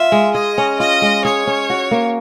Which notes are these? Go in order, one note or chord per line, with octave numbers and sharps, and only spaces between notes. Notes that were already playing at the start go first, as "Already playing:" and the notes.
Already playing: F4 E5
G#3
G#4 D#5
C#4
F4 D#5
G#3
G#4 C#5
C#4
F#4
A#3